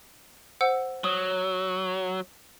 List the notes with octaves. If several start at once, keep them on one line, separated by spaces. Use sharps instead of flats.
C5 F#5 E6
F#3 D#6